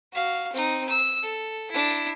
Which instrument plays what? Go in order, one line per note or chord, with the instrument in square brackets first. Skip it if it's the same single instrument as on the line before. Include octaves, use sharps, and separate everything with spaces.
[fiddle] F#4 F5
C4 D#4
E6
A4
D4 E4